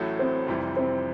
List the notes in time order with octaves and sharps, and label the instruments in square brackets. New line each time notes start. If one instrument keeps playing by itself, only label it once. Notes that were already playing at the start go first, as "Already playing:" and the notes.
Already playing: [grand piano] A1 A2 F#3 A3
[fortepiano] C4
[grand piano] F1 F2 C3 E3 G3
[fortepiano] C4